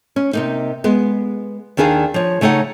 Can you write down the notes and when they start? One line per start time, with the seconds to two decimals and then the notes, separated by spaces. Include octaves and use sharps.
0.16 C#4
0.33 C3 A#3 D#4
0.84 G#3 B3
1.77 D#2 D#3 D4 G#4 F5
2.14 F3 C#5
2.41 C#3 A3 D#4 C#5 F#5